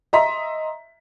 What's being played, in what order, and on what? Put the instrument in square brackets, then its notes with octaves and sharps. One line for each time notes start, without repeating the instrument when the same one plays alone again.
[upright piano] D#5 E5 A#5 C6 B6